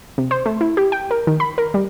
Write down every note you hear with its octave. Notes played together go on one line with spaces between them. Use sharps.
C3
C5
A3
E4
G4
G5
A#4
D#3
B5
A#4
G3